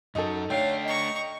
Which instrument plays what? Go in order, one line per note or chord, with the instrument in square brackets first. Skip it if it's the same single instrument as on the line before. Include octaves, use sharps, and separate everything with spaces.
[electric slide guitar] F#2 F#3 [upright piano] D#4 A4
[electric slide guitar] A3 D4 [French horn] C#5 [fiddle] F5 [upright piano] G5
[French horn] D#5 [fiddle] A#5 C#6